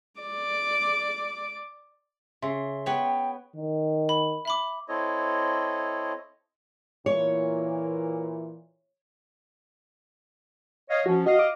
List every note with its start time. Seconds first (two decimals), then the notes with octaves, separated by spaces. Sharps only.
0.21 D5 D6
2.42 C#3 E5 C6
2.86 B3 B4 C#5 G5
3.56 D#3
4.09 B5
4.45 E5 B5 D6
4.88 C4 E4 A4 C#5 D#5
7.06 A#2 E3 C#5
10.90 C#5 D#5 F5
11.06 F3 C#4 F#4
11.26 F#4 D#5 F5
11.39 D6